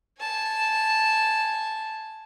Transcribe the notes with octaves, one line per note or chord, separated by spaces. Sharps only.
G#5 A5